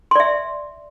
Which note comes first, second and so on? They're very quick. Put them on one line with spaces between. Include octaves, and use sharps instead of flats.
C6 D5 E5